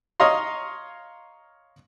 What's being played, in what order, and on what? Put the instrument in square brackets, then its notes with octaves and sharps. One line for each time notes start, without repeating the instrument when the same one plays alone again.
[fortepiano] C#5 D#5 F5 A#5 C6